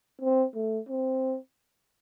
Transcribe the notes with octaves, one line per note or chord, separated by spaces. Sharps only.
C4
A3
C4